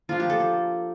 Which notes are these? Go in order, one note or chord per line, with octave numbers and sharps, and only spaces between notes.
F3 A#3 D4 F4
G4
A4
A4